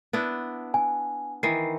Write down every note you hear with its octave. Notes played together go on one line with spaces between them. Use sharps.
B3 D4 E4
G#5
D#3 E3 C7